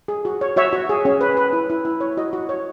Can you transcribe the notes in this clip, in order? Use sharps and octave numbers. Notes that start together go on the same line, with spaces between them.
G#4
F#4
C#5
F#4 C#5 E5
F#4
G#4
C#4
B4
B4
E4
E4
E4
C#5
F#4 D#5
F#4
C#5